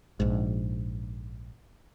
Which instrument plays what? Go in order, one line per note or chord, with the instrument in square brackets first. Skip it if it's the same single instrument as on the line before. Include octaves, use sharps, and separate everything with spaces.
[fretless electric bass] A#1 G#2